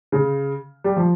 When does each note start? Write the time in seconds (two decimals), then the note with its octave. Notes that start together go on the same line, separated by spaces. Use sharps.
0.12 C#3
0.84 G3
0.96 F3